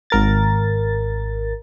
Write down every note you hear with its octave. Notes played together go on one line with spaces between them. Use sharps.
G#1 A#4 A6